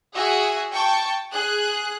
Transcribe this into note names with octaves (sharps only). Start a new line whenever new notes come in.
F#4 G#4 E5 F#5 G#5
G5 A5 C#6
G#4 F#6